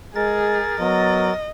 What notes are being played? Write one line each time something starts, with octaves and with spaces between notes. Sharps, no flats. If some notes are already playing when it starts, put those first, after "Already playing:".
G#3 G#4 A#4 A6
F#3 B3 D#5